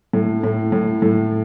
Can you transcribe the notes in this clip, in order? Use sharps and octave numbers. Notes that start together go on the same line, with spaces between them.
A2
A2
A2
A2